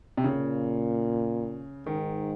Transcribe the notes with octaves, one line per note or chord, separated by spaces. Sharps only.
C3
A#2 C#3
G#2 D#3